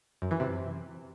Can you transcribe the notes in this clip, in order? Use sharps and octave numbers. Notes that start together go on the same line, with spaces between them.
F#2
E3
C3